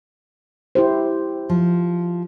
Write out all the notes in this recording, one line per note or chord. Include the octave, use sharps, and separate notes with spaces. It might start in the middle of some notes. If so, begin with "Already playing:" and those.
E4 G4 C5
F3